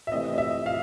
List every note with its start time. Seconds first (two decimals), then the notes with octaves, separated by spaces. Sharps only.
0.07 E5
0.12 C3 E3 A3 C4 D#5
0.34 D#5
0.38 E5
0.66 F5